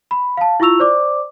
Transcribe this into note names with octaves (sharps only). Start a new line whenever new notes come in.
B5
F5 A5
E4 F4 C#6 E6 F7
C5 D5 D6